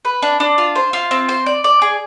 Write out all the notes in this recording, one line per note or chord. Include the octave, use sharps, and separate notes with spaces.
B4
D4
D4
F4
C5
F4
C4
C5
D5
D5
G#4